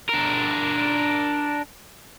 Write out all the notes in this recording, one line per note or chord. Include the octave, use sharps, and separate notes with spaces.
D4 A#4